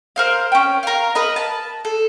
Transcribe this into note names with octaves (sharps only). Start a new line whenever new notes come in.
A#4 C5 F5
C#4 G5
A#4 F5
A#4 B4 D#5
A5
A4